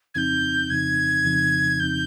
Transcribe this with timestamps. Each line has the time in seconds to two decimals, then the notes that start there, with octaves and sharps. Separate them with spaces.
0.15 F2 C#3 F3 C4 D#4 G6 G#6
0.70 F2 C#3 F3 C4 D#4 G#6
1.25 F2 C#3 F3 C4 D#4
1.80 F2 C#3 F3 C4 D#4 G6